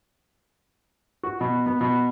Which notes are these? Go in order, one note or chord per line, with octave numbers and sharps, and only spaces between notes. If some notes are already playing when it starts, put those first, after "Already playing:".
F#4
B2
B3
B2